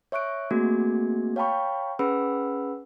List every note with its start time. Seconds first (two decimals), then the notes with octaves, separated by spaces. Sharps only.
0.12 C#5 E5 C#6 F#6 D7
0.51 A3 A#3 C4 F#4 G#4 G#6
1.36 C#5 F5 G5 A5 B5 C#6
1.99 C#4 G#4 B4 F#5 B5 E6